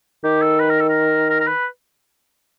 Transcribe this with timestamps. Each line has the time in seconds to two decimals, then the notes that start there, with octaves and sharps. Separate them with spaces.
0.24 D#3 G4
0.42 A4
0.59 B4
0.70 A#4
0.79 A4
0.89 A#4
1.30 A#4
1.40 A#4
1.47 B4